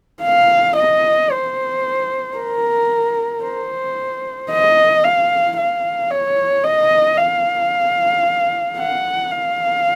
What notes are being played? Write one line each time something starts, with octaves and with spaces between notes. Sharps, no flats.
F5
D#5
C5
A#4
C5
D#5
F5
F5
C#5
D#5
F5
F#5
F5